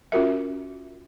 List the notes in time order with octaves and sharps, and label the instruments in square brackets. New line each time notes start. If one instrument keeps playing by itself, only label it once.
[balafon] C#4 F4 F#4 A#4 E5